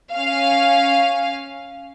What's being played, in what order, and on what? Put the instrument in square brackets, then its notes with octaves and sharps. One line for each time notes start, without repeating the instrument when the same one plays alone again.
[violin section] C#4 F5